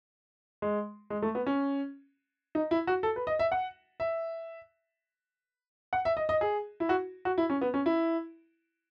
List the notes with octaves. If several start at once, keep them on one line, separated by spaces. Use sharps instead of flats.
G#3
G#3
A3
B3
C#4
D#4
E4
F#4
A4
B4
D#5
E5
F#5
E5
F#5
E5
D#5
D#5
G#4
E4
F#4
F#4
E4
C#4
B3
C#4
E4